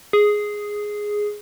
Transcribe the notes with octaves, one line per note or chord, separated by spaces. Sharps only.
G#4